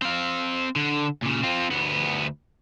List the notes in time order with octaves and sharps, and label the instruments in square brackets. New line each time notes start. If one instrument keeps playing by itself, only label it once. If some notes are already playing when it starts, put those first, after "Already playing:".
[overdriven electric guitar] C4 F5
D3
A#2 C#3
C4 F4
D2 B3